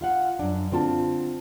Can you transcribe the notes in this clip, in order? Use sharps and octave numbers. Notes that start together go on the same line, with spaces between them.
F4 F5 F#5
F#2 D4
D3 C4 F4 A5